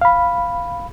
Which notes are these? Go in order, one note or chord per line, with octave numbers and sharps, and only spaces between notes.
F5 B5